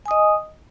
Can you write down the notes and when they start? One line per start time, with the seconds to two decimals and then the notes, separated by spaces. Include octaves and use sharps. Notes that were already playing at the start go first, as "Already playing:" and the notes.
0.06 G#5
0.08 D#6
0.11 D#5